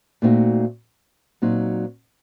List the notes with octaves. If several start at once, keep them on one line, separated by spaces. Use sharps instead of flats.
A#2 A3 C4 D#4 F#4
A#2 F#3 C4 D#4